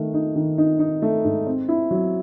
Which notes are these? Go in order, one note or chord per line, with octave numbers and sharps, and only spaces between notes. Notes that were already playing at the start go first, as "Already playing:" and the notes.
Already playing: D#3 A3
D#4
D#3
D#4
D#4
A3
G#2
C4
E4
F#3